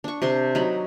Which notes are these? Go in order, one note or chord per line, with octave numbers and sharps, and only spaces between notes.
D4 C#6
C3 D4 C6
F#3 D#4 B5